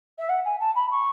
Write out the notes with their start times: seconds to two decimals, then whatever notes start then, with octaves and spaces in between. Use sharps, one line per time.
0.18 E5
0.29 F#5
0.45 G#5
0.60 A5
0.75 B5
0.91 C#6